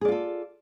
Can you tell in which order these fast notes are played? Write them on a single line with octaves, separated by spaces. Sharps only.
G#4 D5 F4 A4